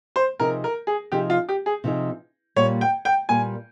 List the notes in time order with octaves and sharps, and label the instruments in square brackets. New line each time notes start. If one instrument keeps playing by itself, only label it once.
[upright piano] C5
[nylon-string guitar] C3 F3 C4 D#4 G#4 [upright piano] A#4
[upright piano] A#4
G#4
[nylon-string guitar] C3 F3 C4 D#4 G#4 [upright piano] G4
[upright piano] F4
G4
G#4
[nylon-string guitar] C3 F3 C4 D#4 G#4
[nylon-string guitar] A#2 G3 A#3 [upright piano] C#5
[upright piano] G5
G5
[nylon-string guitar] A#2 G3 A#3 [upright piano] G#5